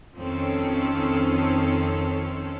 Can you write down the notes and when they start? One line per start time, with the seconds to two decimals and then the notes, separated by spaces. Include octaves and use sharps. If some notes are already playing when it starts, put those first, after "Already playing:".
0.16 F2 D#3 C4 C#4 A4 C#5